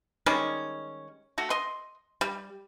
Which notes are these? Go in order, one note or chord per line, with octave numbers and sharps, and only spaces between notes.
D#3 G3 G#3 C#4
A3 F#4
D#5 C6
G3